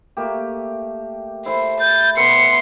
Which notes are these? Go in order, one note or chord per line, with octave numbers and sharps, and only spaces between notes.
A3 A#3 G4
E4 A4 C5
G6 A6
B3 A4 C6 C#7